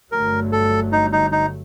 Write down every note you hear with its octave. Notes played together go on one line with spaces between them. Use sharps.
G1 G2 D3 F#3 A3 A#4
A4
D#4
D#4
D#4